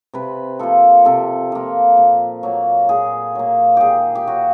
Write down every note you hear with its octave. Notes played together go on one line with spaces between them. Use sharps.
C3 B4
F3 A#3 A4
C3 A4
F3 A#3
A#2
F#3 A#3
A#2 G#4
F#3 A#3
D#3 G4 G#4
G4
F#3 A#3 F#4